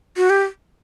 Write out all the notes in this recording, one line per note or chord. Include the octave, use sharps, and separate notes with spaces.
F#4
G4